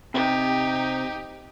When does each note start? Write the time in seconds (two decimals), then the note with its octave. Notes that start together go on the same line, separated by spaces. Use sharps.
0.14 C3 D#4 G4